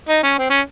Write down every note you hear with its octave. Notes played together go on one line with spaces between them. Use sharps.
D#4
C#4
C4
C#4